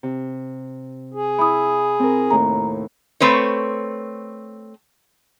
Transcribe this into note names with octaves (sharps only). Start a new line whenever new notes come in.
C3
G#4
E4 B5 D#6
C4 A#4
D#2 A2 A#5
A3 C4 B4 C#5